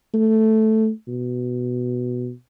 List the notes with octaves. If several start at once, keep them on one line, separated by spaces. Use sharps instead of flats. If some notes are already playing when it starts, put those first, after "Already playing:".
A3
B2